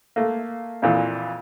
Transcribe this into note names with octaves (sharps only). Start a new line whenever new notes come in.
A3 A#3
F2 A#2 E3